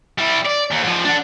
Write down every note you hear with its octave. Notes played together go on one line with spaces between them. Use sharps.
G3 E4
D5
D#2
G#2 F3
D4 F#5